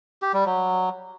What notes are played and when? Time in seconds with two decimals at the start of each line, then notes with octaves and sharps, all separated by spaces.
0.22 G4
0.34 G3
0.46 F#3